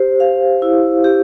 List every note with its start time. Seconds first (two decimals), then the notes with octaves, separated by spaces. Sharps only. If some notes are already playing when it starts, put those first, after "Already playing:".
Already playing: G4 C5
0.20 F5
0.62 E4
1.04 G4